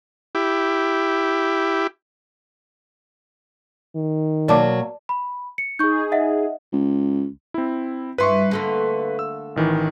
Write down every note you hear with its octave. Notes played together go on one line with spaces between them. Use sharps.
E4 G4
D#3
B2 F#3 A#3 D5 A5 D6
B5
C#7
D#4 G#4 C#6 G6
D#5 E5 F#5
C#2
C4 E4
G2 E4 B4 C6 C#6
D3 A3 A#3
E6
A1 D#3 E3